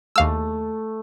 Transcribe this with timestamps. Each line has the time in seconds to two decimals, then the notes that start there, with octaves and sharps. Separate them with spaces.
0.16 D#2 A3 F5 E6